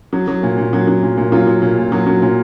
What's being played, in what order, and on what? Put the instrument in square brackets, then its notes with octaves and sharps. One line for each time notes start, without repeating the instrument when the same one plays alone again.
[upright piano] F#3
F#3
A#2
A#2
F#3
F#3
A#2
A#2
F#3 F4
F#3
A#2
A#2
F#3
F#3
A#2